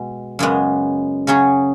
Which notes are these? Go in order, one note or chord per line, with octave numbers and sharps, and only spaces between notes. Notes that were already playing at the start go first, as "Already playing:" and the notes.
Already playing: B2 G#3
F#2 C#3 G#3 B3
C#3 F#3 C#4 G#4